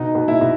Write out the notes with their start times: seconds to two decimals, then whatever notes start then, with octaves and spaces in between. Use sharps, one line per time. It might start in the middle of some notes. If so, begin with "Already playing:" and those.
Already playing: B2 D#4 D#5
0.15 B2
0.28 E4 E5
0.41 B2